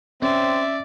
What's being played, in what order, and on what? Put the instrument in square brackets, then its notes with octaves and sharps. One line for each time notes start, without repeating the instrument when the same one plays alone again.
[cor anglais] C4 [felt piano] C#4 [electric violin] D5 [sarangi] E5